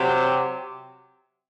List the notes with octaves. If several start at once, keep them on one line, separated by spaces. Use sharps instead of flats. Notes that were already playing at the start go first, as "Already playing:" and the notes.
Already playing: C3 F#3 C4 G4